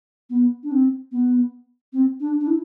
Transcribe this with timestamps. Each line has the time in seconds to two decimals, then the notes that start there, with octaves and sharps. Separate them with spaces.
0.30 B3
0.63 D4
0.72 C4
1.12 B3
1.93 C4
2.20 D4
2.40 D4
2.47 E4